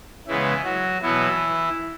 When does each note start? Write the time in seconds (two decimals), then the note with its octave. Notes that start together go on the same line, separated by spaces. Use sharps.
0.27 C#3 E3 G#3 B3 E4
0.64 F#3 F#4
1.02 B2 E3 F#3 B3 E4